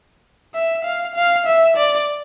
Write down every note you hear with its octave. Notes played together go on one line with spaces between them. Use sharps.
E5
F5
F5
E5
D5